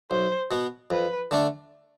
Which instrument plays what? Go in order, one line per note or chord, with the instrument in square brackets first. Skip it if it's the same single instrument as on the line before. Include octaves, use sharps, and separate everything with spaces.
[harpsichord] B1 [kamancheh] C5
[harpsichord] B2 B3
[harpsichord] F2 [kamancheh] B4
[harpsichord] D3 A3 D4